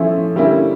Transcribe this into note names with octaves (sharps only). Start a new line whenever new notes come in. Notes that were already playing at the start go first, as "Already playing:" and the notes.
Already playing: F3 A3 C#4 E4
D3 G3 A#3 C#4 E4